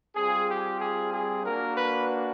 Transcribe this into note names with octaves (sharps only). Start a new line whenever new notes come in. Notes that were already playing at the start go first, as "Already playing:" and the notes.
G3 C4 F4 G#4
G4
G#4
G#4
A#3 D4 F#4 A#4
B4